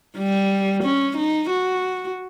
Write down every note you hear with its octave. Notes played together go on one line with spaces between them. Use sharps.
G3
C#4
D#4
F#4